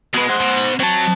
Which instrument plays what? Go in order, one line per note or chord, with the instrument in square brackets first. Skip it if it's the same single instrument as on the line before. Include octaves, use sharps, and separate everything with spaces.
[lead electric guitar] B2 B4 [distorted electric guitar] G#3
[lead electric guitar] C5 F#5
[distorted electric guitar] B2
[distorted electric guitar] F#3 [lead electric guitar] C4 A5